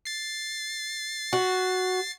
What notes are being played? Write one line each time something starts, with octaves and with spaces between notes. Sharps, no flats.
A6 C7
F#4